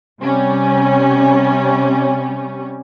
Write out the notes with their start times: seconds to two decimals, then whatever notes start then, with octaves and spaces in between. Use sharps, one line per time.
0.21 C3 G3 C#4